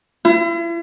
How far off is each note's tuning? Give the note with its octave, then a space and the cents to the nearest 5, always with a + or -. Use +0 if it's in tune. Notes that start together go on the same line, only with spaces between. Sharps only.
E4 +40